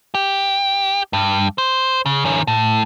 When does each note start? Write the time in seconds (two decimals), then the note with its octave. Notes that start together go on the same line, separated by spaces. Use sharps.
0.15 G4
1.13 G2
1.58 C5
2.06 C#3
2.25 D#3 C#4
2.47 A2